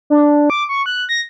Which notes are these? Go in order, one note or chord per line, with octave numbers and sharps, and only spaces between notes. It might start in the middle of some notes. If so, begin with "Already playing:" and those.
D4
D6
C#6
F#6
A#6